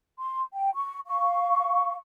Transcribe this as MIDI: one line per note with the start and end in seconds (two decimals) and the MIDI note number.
0.20 0.42 84
0.53 0.70 79
0.74 0.99 85
1.07 1.94 77
1.07 1.94 85